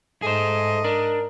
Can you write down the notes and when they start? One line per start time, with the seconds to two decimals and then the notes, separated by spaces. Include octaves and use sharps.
0.22 G#2 A3 G#4 C5 D#5
0.84 D4 A#4